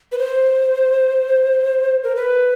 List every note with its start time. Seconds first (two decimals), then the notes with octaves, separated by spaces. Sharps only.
0.12 B4
0.18 C5
2.04 A#4
2.16 B4